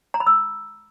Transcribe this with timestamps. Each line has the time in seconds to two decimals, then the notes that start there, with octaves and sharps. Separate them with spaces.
0.14 A#5
0.20 B5
0.26 E6